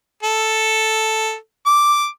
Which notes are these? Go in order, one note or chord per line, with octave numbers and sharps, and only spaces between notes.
A4
D6